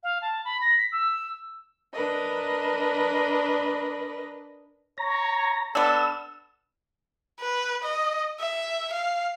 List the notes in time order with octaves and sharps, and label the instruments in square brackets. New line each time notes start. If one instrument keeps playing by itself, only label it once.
[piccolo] F5
A5
B5
A#6
B6
E6
[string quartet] D4 A#4 B4 D#5
[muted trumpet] C#5 [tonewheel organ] A#5
[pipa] B3 D4 [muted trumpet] A4 [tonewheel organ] E6
[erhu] B4
D#5
E5
F5